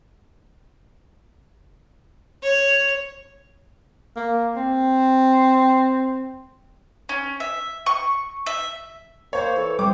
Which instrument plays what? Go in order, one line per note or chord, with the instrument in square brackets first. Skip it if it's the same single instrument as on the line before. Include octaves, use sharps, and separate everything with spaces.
[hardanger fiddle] C#5
[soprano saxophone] A#3
C4
[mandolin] C#4
E5
C#6
E5
[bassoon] A#3 [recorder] C5 [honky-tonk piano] C#5
[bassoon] E3 [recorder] A4
[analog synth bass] G3 [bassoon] C4 [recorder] C5 [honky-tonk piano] D6